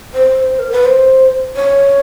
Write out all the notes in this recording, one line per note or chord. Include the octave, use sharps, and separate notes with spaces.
C5
A#4
B4
C5
C#5